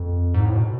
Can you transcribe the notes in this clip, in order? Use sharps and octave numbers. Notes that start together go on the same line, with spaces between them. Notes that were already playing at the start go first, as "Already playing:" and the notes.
Already playing: F2
G#2
A2
B2